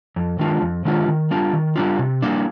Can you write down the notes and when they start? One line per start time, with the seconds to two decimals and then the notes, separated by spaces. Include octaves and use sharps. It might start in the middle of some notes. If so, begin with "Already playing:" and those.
0.16 F2
0.39 D#3 G#3 D4 F4
0.62 F2
0.85 D#3 G#3 D4 F4
1.08 D#3
1.31 G3 D4 F4
1.53 D#3
1.76 G3 D4 F4
1.98 C3
2.22 G3 A#3 D4